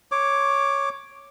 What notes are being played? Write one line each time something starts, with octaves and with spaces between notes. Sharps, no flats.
C#5 D6